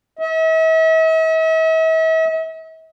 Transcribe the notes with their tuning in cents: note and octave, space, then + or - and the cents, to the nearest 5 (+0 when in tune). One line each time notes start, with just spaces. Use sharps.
E5 -45